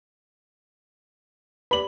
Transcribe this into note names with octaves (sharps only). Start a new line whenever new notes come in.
B4 D5 B5 F#7